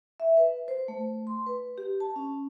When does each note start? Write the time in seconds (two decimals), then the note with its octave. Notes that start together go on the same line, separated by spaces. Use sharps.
0.20 E5
0.37 B4
0.68 C5
0.88 A3
1.27 C6
1.46 B4
1.78 G4
2.00 A5
2.16 C#4